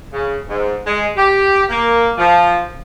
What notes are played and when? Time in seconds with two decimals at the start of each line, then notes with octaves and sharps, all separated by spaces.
0.12 C#3
0.47 G#2
0.86 G#3
1.16 G4
1.69 A#3
2.17 F3